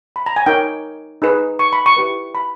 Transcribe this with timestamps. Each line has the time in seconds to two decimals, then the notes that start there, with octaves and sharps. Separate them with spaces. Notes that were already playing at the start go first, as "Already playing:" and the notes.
0.16 B5
0.26 A#5
0.36 G#5
0.46 D#4 A#4 C#5 G5
1.22 D#4 G#4 B4
1.59 C#6
1.73 B5
1.86 C#6
1.97 E4 G4 B4
2.35 B5